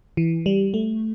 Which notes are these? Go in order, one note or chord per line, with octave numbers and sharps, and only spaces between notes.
E3
G3
A3